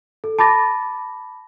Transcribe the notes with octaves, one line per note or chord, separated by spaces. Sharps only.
A4
A5 B5 D6 A6 A#6